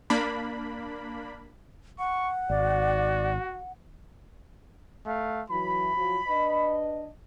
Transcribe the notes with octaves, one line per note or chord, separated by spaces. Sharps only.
A#3 D4 B5
F#5 C#6
G#1 F#4 D5
A3 F5
E3 F#3 B5
F3 F#3
D4 B4 D#5